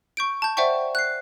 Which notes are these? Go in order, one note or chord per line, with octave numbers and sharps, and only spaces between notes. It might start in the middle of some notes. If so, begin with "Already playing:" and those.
C#6 G6 D7
A5 G6
C5 D5 E5 F#5 G5 C#6
F#6 C7